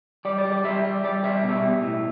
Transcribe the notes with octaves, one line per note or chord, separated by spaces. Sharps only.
G3 D5
D5
G3
D5
G3 E5
G3
G3 D5
G3 E5
B2
E5
B2
A2